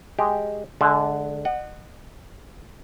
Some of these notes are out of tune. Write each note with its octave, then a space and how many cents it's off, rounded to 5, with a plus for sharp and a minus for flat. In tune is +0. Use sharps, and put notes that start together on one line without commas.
G#3 +0 G4 +0 G5 +0
D3 +0 G#3 +35 A5 -20
D#5 -40 F#5 +0